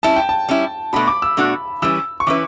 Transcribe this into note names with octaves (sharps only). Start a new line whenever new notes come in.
G3 C#4 E4 A5
G5
A5
G3 C#4 E4
B2 A3 D4 F#4 B5
D6
E6
B2 A3 D4 F#4
E3 G3 C#4 E4 B4 E6
C#6
E3 G3 C#4 E4 B4 D6